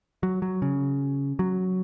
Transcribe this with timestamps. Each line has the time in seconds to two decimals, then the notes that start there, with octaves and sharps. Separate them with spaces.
0.23 F#3
0.42 F#3
0.62 C#3
1.39 F#3